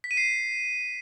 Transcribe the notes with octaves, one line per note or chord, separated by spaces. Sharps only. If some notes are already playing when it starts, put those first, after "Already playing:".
B6
D#7
C7